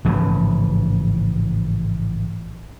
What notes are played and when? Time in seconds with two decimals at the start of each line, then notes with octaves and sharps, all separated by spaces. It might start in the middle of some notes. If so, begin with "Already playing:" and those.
0.05 A1 G#2 C#3 F3